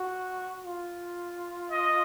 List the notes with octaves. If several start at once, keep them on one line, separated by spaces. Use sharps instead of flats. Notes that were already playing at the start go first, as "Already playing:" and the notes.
Already playing: F#4
F4
D#5